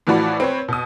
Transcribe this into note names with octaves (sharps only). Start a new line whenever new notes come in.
A2 E3 F3 F#4 D5 B5
C4 B4 C#5
B2 D#6